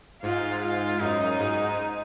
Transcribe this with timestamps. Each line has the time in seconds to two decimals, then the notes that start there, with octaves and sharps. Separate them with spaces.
0.22 G#2 F4
0.62 F4
1.00 F#2 D#4
1.39 G#2